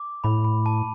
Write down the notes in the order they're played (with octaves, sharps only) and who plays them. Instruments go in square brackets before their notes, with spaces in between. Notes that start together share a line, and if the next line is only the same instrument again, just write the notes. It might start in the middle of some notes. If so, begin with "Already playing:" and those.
Already playing: [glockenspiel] D6
[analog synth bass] A2 [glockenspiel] B5
[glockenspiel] B5
A5